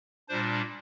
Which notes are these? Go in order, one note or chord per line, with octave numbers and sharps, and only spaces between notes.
A#2 G3 D4 C5